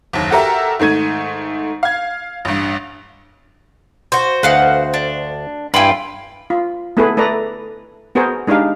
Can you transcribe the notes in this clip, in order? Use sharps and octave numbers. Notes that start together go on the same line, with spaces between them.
F#1 D#2
F#4 G4 A4 A#4 E5
G#2 D#3 A3 G#6 D#7
F5 G#6
A1 G2
F#4 C5
D2 B4 D#5 F5 F#5
D4
G2 E4 F4 G5 G#5 B5
F4
A3 B3 E4 G#4 A4 B4
A3 A4 B4 D5 A#5
B3 F#4 G#4 A#4 C5
G#3 D4 D#4 G4 F5